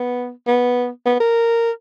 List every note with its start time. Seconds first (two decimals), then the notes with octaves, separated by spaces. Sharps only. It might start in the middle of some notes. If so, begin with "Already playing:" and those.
Already playing: B3
0.47 B3
1.05 B3
1.20 A#4